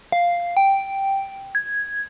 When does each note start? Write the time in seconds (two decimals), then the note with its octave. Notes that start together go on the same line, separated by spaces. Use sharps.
0.12 F5
0.57 G5
1.55 G#6